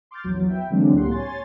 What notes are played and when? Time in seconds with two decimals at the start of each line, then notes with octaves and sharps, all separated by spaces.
0.11 C6 D6 F6 G6 A6
0.24 A#1 E2 F#3
0.47 B4 E5 G5
0.70 D3 E3 F#3 G#3 C4 D4
0.93 C#2 A2 A#3 G4 F#5 C6
1.11 C#5 G#5 C6 A6